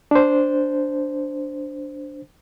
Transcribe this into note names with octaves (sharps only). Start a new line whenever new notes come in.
D4 C5